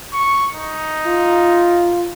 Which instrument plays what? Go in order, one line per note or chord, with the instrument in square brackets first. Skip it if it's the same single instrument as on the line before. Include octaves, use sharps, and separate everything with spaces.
[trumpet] C#6
D#4
[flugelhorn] F4